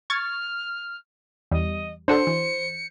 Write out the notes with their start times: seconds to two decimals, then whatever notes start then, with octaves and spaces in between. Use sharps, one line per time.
0.10 C#6 F6 G#6 A6
1.51 E2 G3 D#5
2.08 D4 F#4 A4 C5 C#7
2.27 E3